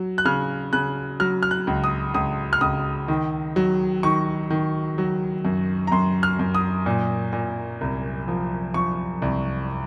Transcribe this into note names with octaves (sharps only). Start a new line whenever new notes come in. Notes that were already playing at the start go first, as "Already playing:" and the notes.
Already playing: F#3
F#6
C#3 F6
C#3 F#6
F#3 F6
F6
F#6
C#2
D#6
C#2 D#6
F6
C#2 D#6
D#3
F#3
D#3 C#6
D#3
F#3
F#2
A#5
F#2 C6
F6
F#2
D#6
A#2
A#2
C2
F3
F3 C#6
C2